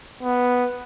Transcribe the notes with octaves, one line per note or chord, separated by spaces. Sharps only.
B3